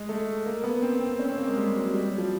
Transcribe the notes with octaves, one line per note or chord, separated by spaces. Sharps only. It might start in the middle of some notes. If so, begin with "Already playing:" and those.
Already playing: G#3
A3
A#3
B3
C4
C4
C#4
C4
A#3
G#3
G3
F#3
G3
F#3
F3